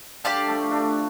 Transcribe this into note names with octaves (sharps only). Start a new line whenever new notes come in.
D3 G3 G4 D5 F5 A5
F3 A3
A3 D4